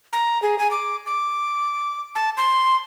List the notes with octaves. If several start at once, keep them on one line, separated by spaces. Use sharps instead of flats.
A#5
G#4
G#5
D6
D6
A5
C6